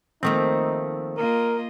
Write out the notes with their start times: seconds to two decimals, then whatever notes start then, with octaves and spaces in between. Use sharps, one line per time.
0.23 D#3 F3 A3 A#3 C4 D#4
1.17 A#3 F4 A#4 D#5